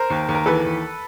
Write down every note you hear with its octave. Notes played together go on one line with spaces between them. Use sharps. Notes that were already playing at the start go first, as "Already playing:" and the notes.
Already playing: A#4 C5
D#2
D#2
A#4
E3 A4 B4
D#2